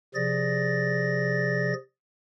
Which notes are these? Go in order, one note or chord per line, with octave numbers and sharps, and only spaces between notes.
C3 F3 G#4 D5 A6 A#6